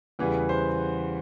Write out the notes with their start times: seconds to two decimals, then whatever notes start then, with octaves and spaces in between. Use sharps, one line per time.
0.19 E2 C#3 E3 G3 B3 B4
0.49 C5